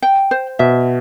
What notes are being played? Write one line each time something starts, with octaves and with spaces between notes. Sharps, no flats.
G5
C5
B2 E5